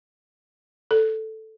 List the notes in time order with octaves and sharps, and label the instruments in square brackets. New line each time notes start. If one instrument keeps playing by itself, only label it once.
[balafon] A4